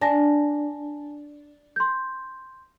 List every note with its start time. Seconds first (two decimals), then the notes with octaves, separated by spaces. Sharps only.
0.02 D4 G#5 A5 A#6
1.76 C6 G6